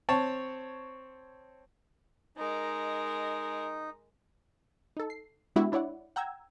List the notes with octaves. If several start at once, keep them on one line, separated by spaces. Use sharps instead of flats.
C4 C#5 A5
G#3 D#4 A#4
D#4 A4
C7
G#3 B3 D4 E4 F#4 G4
D4 E4 C#5 D5 F#5
F#5 G5 A#5 E6 G#6